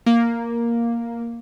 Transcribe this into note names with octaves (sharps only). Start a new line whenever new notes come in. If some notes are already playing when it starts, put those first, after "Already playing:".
A#3